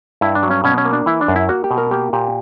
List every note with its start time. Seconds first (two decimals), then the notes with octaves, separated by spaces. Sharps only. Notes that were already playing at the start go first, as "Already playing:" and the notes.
0.21 G2 E4
0.35 D4
0.43 F#3
0.50 C#4
0.64 B2 C#4
0.78 C#4
0.85 A#3
0.93 D4
1.06 E3 E4
1.21 D4
1.28 F#2
1.36 E4
1.49 A#3 F#4
1.64 G4
1.71 B2
1.78 A#4
1.91 A#3 G4
2.13 A#2 G4